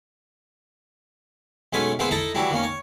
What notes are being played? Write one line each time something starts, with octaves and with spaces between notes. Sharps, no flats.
B1 G#3 A3 C#4 G#5 B5
A#3 B3 E4 G#4 B4 C5
D#4 E4 A4 A5 A#5
E3 F#3 G3 D4 E4
D#3 A#3 C#4
C#5